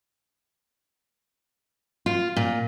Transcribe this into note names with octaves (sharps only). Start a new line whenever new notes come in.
F4
A#2